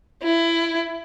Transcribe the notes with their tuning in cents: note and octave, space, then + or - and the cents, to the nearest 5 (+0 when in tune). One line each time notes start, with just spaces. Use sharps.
E4 +20